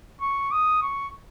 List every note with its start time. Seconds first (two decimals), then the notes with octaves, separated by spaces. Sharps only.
0.22 C#6
0.52 D#6
0.82 C#6